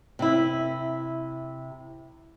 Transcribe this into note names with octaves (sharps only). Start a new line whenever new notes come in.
C3 E4